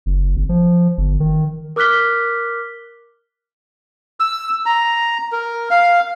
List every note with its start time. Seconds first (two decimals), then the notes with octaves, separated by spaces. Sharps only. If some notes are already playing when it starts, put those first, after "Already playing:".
0.06 F#1
0.36 G#1
0.49 F3
0.98 G1
1.20 D#3
1.76 A#4 D6 F6 F#6 B6 G7
4.20 E6
4.66 A#5
5.32 A#4
5.71 F5